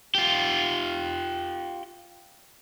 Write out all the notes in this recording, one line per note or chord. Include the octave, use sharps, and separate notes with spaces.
F4 G4